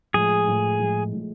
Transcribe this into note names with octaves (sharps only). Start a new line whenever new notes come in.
A2 F3 G#3 G#4
A2 F3 G#3
A2 F3 G#3
A2 F3 G#3